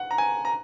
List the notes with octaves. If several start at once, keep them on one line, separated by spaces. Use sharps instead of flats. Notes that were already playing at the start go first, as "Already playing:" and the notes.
Already playing: F#5
A#5
G#5
A#5